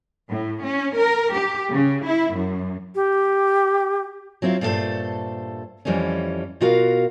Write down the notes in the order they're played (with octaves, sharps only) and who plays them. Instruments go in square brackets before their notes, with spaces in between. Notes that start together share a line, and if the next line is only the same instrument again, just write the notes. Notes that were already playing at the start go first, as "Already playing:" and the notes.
[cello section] A2
C#4
A#4
G4
C#3
E4
F#2
[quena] G4
[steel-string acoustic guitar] F#3 C4 E4 F4
G2 A#2 A3 C#4 A4 C5
F2 E3 G3 A3 C#4
B2 F4 F#4 A#4 F5